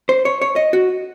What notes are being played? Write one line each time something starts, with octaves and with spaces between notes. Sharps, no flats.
C5
C#5
C#5
D#5
F#4